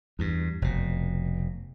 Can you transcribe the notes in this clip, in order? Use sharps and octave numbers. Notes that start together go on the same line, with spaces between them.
E2 G2
F1 B2